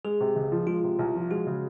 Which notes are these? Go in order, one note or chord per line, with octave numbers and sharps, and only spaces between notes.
G#3 G#4
C3
C#2
F3
G#3 F4
C3
C2
F3
G#3 F#4
C#3